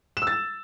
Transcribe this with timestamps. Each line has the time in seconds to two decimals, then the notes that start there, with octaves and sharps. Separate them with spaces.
0.17 E7
0.22 E6
0.27 A6